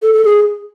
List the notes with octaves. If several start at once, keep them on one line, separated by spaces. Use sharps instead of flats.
A4
A4
G#4